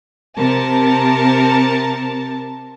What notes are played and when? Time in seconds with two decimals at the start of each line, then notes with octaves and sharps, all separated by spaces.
0.37 C3 A#4 A5